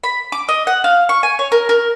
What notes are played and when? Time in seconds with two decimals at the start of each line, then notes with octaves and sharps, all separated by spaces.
0.04 B5
0.32 D6
0.49 D#5
0.67 F#5
0.84 F5
1.09 C#6
1.23 G#5
1.39 C#5
1.52 A#4
1.69 A#4